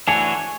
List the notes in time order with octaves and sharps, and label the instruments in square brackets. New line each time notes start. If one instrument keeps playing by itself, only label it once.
[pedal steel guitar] E3 A3 D4 F#4 C#5 [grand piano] G#5